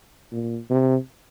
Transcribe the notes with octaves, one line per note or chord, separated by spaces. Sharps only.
A#2
C3